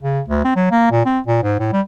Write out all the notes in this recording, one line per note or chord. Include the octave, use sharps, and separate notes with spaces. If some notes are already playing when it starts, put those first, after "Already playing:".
C#3
D2
C4
F#3
A#3
A#2
C4
A#2
G#2
A2
G3